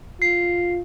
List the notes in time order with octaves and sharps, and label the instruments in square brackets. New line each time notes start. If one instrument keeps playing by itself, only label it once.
[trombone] F4 [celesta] C7